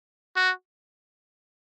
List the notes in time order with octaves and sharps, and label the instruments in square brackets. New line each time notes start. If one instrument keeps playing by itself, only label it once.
[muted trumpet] F#4